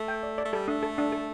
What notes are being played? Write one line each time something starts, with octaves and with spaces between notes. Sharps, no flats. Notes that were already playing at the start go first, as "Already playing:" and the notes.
Already playing: A3
G5
D5
D5
A3
G3 A4
A3 D4
A4
D4
A4